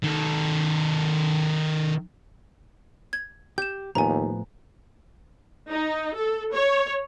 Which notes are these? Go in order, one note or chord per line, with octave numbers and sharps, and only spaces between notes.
D#3 A4
G#6
G4 G6 E7
D#2 A2 F3 B3 G#5 A#5
D#4
A4
C#5